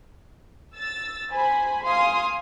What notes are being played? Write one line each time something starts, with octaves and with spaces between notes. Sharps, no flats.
E6 A6
C5 G#5 B5
F5 G#5 C6 D#6